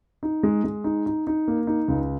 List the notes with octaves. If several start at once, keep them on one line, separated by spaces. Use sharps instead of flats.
D#4
G#3
G#3
D#4
D#4
D#4
A#3
D#4
C#2